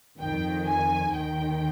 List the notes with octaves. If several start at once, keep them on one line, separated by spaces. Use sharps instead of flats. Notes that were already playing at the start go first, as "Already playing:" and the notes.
F2 D#3 G5
G#5
D#2 D#3 G5